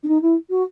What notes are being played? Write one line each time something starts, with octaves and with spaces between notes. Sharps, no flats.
D4
D#4
E4
F#4